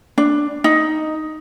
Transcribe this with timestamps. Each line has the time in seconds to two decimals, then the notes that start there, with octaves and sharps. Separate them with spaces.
0.18 D4
0.64 D#4